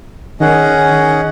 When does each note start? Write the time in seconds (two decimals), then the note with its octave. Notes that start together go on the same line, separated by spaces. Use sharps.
0.40 D#3 C#4 G#4 D#5 F#5
0.91 D#3